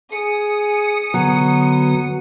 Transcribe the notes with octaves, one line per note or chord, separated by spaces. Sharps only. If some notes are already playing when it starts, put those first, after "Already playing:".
G#4 D#6 C#7
D3 F#3 B3 B4